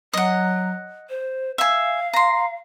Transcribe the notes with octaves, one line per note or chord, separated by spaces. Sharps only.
F#3 D#5 F#5
C5
E5 F5 G#5
A#5 C6